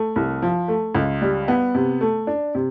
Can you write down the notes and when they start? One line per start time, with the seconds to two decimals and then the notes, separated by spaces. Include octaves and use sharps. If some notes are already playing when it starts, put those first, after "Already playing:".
Already playing: A3
0.16 C2
0.42 F3
0.68 A3
0.95 C#2
1.22 G3
1.48 B3
1.75 C3
2.01 A3
2.27 D4
2.55 C3